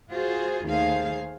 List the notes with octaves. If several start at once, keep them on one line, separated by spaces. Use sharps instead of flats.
F4 F#4 G#4 C5
D#2 D#3 A3 G#4 C5 F5